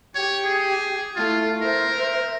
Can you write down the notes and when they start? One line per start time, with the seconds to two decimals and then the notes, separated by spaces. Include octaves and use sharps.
0.15 G4 C#5
0.45 G#4
1.16 A3 E4 F4
1.61 A#4 C5 E5